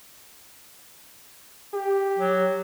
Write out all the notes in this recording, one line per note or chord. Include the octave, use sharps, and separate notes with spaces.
G4
F#3